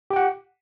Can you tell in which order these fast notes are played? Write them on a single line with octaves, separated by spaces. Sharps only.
G4 G5 F#5